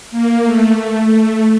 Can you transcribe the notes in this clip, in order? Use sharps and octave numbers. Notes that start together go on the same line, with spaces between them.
A#3
A3
A3